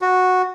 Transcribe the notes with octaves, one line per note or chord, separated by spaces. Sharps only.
F#4